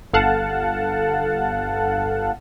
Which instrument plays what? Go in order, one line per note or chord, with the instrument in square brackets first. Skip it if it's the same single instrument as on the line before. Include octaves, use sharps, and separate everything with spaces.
[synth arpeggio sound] G1 A4 F5 F#5 A5